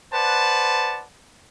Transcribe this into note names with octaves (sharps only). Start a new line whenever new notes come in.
B4 C5 D5 F#5 A5